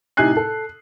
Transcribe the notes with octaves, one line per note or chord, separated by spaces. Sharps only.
A2 C3 D#4 G#5 F#6 C7
A4